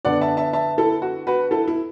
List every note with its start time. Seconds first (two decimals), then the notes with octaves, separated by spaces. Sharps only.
0.05 D3 B3 D5 F#5
0.21 E5 A5
0.37 E5 A5
0.53 E5 A5
0.78 E4 A4
1.02 F#4
1.27 F#4 B4
1.51 E4 A4
1.68 E4